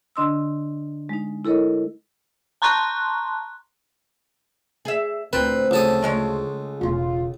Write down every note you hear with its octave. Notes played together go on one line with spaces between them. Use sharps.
D3 D4 D#5 C6 D#6 E6
G#3 D#4
E4 A4 A#4 C#5 D#5
A5 A#5 C6 C#6 F#6
G#4 E5
D2 A#2 C4 B4
C#2 F3 A3 A4 D#6
C#3 G#3 C#5
E1 B3 F4